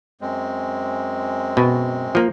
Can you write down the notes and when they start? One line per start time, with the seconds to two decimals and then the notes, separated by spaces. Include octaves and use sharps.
0.21 F#2 G#3 C4
1.57 B2
2.15 F3 A#3